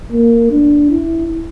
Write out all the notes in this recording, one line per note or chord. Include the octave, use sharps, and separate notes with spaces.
A#3
D4
E4